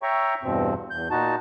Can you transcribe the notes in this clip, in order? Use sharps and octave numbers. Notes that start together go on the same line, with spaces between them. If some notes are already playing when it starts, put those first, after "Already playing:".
C#5 E5 G5 A#5 C#6
E2 G2 B2 C4
E2 G6
A#2 D#4 F#4 A5